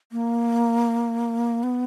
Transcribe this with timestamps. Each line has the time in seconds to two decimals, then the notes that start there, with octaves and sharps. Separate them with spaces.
0.12 A#3
1.63 B3